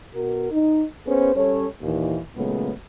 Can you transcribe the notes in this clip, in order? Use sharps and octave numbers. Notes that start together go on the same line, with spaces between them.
B2 F#4 A#4
D#4
B3 C#4 G#4 B4 C5
G3 C#4 A4 C#5
D#2 A#2 E3
A#2 C#3 F#3 G#3 A3 B3